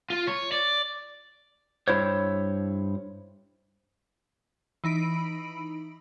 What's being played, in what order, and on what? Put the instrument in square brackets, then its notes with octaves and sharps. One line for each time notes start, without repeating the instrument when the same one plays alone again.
[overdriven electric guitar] F4
C#5
D5
[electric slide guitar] G2 G#3 E4 C5 C#5
[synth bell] E3 D#4 B5 D7